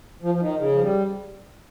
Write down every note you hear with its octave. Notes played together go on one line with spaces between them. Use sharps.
F3
F3
D#3
C#3
F3
G3